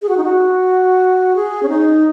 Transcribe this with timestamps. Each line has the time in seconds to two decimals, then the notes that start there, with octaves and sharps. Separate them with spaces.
0.02 G#4
0.09 F#4
0.17 D#4
0.24 F#4
1.36 G#4
1.63 C#4
1.69 D#4